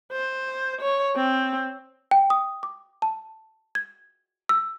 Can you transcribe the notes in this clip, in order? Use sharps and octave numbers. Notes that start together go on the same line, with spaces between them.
C5
C#5
C4
G5
D#6
D6
A5
G#6
E6